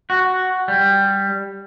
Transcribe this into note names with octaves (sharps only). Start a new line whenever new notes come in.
F#4
G3